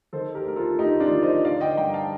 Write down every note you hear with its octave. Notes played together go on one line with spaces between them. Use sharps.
D#3 A4 C5
G4 A#4
D2 A#4
F4 A4
D2 D#4 G4
D4 F4
D#3
C5 D#5
D3 D5 F5
D#5 G5
G2 G5 A#5
F5 A5